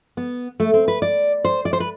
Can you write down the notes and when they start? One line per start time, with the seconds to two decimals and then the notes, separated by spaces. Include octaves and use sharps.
0.17 B3
0.60 A3
0.74 C4
0.88 B4
1.02 D5
1.44 C5
1.65 D5
1.73 C5
1.80 B4